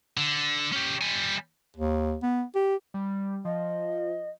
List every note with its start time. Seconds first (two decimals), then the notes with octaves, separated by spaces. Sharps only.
0.17 D3
0.73 C#4 G4
1.01 G3 G#5
1.77 D#2
2.23 B3
2.55 G4
2.94 G3
3.45 F3 D#5